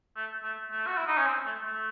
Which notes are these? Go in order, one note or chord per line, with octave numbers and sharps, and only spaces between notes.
A3
A3
A3
F#4
E4
D#4
C#4
C4
A3
A3